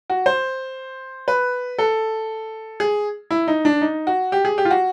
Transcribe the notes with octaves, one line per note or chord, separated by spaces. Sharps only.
F#4
C5
B4
A4
G#4
E4
D#4
D4
D#4
F#4
G4
G#4
G4
F4
F#4